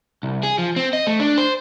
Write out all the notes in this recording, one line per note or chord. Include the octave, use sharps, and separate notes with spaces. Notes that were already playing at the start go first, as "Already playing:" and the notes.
C2
G#4
F3
C4
D#5
A3
D4
C5